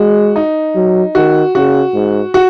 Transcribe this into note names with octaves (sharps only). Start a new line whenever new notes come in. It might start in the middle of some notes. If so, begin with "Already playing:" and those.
Already playing: G#3 F#4
D#4
F#3
D#3 F#4
C#3 F#4
G#2
F#4